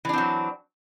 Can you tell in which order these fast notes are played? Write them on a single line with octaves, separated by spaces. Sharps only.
E3 D4 C4 F#3